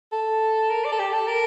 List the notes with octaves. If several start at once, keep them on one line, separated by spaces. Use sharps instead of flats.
A4
A#4
D5
A4
G4
A4
A#4